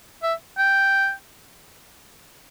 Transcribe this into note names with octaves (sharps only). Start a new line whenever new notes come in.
E5
G5